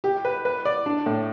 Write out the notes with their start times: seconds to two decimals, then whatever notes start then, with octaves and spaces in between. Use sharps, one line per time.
0.04 G4
0.25 B4
0.45 B4
0.65 D5
0.86 D4
1.06 A2